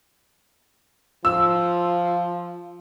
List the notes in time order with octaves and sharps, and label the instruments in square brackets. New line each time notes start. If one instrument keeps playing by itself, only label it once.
[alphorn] F3 [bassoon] F4 [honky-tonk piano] E6